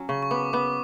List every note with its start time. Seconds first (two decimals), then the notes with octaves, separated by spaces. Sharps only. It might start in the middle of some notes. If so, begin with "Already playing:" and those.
Already playing: F#3 C#4
0.09 C#3 C#6
0.23 C#6
0.31 B3 D6
0.53 B3 D6